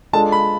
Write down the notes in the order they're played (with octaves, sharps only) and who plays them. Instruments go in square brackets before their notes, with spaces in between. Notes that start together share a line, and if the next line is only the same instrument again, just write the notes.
[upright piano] G#3 D4 F4 A4 [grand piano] A5
[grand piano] B5